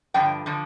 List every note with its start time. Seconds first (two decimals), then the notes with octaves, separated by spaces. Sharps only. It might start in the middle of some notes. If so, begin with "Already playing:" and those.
0.14 G2 D3 F3 G5
0.46 D3 F3